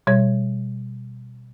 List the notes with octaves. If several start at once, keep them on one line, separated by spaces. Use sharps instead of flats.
B2 G3 C#5 G#6